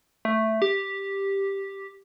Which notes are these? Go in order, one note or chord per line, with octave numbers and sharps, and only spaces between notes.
A3
G4